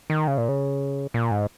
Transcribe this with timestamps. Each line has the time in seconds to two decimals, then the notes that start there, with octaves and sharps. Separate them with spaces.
0.10 D#3
0.28 C#3
0.38 A#2
0.49 C#3
1.14 A#2
1.31 G#2